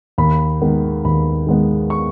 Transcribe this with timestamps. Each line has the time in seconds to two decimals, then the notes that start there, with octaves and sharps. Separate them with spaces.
0.18 D#2 B5
0.62 D#3 G#3 B3
1.05 D#2 B5
1.47 D#3 G#3 B3
1.90 C#6